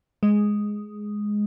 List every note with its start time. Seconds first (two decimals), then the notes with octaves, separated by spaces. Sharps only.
0.23 G#3